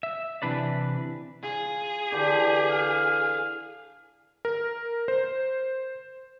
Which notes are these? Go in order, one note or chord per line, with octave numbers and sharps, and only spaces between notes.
E5
C3 E3 D4 B4 D5
F4 G#4
D3 E3 G4
F5
A#4
C5